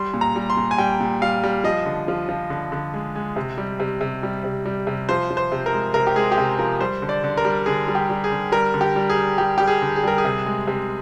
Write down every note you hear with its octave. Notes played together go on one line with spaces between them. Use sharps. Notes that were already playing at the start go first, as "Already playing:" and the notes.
Already playing: G3 C6
A#2
A#5
G3
C6
A#2
G#5
G3 G5
A#2
G3 F5
G3
F3 D#5
D3
F3
F3
D3
D3
G#3
G#3
C3
G3
C3
C3
G3
C3
G3
C3
F3 C5
F3
C5
C3
A#4
G#3
C3 A#4
G4
G#3 G#4
G4
C3 G#4
F3 A#4
G3 C5
D3
D5
D3
A#4
G3
D3 G#4
G3
G4
G3
G#4
D3
G3 A#4
D3
G4
G3
G#4
G3
G3 G4
G3 G4
G#4
D3
G#4
G3 A#4
G#4
C3
G#3
C3